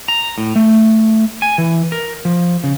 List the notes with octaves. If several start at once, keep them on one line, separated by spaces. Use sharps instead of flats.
A#5
A2
A3
G#5
E3
A#4
F3
C#3